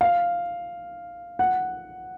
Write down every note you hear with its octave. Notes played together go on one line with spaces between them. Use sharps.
F5
F#5